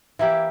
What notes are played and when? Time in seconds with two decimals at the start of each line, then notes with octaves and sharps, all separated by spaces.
0.19 E3 A#3 E4 G4